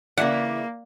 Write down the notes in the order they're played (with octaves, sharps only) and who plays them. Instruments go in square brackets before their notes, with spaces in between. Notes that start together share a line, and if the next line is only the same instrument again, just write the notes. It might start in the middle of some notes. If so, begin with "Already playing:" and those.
[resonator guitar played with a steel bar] C#3 E3 E4 [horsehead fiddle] A#3 [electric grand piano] D5 [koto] F#5